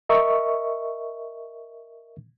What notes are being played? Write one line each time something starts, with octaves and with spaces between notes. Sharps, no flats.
A#4 D#5 E5 C#6